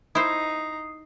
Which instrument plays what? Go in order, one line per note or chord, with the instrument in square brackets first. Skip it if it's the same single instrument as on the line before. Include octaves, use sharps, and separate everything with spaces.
[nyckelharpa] D#4 A#5 [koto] E4 C5 [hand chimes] D#6 C7